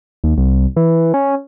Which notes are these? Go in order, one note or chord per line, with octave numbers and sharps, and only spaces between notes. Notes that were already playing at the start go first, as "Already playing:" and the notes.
D#2
C2
E3
C#4